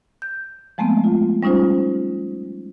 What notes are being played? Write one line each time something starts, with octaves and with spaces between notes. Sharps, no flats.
G6
F3 G#3 A3 B3 C4
F4
G3 C#4 D#4 F4 C5